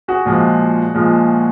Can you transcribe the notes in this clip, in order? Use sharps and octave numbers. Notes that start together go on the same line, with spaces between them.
F#4 G#4
A#2 F3 G#3
A#2 F3 G#3